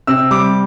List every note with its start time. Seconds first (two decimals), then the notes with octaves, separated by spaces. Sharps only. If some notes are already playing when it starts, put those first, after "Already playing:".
0.07 C3 E6
0.31 G3 D6